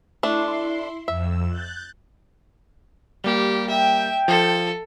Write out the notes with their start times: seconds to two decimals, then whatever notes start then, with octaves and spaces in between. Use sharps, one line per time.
0.23 A3 D4 E4 C6
1.08 F2 E5 E6
1.49 F#6 G6 A6
3.24 G3 A#3 G4
3.69 E5 G5
4.28 F3 A4